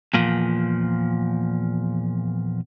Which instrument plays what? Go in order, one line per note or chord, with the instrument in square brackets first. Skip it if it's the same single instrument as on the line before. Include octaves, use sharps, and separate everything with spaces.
[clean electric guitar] E2 A#2 F3